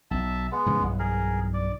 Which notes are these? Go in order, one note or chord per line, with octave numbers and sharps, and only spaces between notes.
B1 E5 A5
G#3 B3
G#2 C#3 F3
B1 G2 E3
G#4 A#4
D5